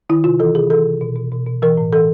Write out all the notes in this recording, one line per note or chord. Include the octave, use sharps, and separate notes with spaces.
D#3 E4
C3 F4
E3 A4
C3 G#4
E3 A4
C3
B2
B2
B2
B2
E3 A#4
A2
E3 A4